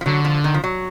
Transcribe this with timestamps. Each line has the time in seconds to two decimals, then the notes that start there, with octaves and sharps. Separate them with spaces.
0.01 F3
0.06 D3 F#3
0.25 F3
0.44 D#3
0.54 F3
0.64 F#3